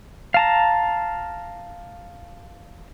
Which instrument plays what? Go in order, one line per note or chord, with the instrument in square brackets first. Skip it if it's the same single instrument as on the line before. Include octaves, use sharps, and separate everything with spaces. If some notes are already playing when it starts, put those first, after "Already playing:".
[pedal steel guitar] F5 A5 A#5